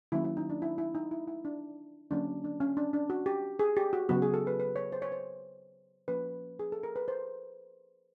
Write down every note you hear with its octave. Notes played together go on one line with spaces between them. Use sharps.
D#3 F#3 A#3 C#4 E4
E4
D#4
D4
E4
E4
D#4
E4
E4
D4
D3 F#3 A#3 C#4 D4
D4
C#4
D4
D4
F#4
G4
G#4
G4
F#4
C#3 F#3 B3 F#4
G#4
A4
B4
B4
C#5
C5
C#5
C5
F3 A#3 C#4 B4
G#4
A4
A#4
B4
C5